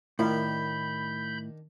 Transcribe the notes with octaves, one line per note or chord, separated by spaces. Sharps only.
A2 D#3 D4 E4 F4 A#4 B5 G6